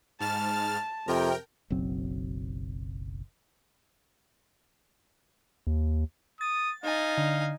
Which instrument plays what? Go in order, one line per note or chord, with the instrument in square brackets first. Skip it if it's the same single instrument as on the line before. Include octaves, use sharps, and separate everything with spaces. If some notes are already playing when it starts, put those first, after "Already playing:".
[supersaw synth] G#2 F6 A6 [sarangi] A5
[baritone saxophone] F2 [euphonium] C3 [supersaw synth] A#4 G5
[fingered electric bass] F#1 B1 F#3 C4
[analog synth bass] D#2
[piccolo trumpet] D#6 [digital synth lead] A6
[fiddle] D#4 G#5 [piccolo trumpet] F5
[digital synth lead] D3